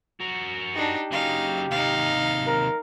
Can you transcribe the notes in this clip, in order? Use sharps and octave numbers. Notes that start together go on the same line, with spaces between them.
F#4 A#4
D4 D#4 G4
C#3 F#3 D#4 F5
D#2 C3 D#4 F5
A#4